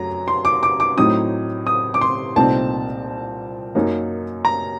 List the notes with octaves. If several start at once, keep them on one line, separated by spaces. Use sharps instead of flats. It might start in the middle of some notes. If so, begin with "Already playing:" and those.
Already playing: F#2 F#3 A3 A#5
C6
D6
D6
D6
A2 F#3 C4 D#4 D#6
D#6
D6
C6
C2 A#2 A3 C4 D#4 A5
F#2 F#3 A#3 D#4
A#5